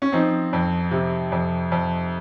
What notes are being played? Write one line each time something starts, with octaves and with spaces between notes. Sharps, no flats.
C#4
F3 C4 D#4
F2
C3
F2
F2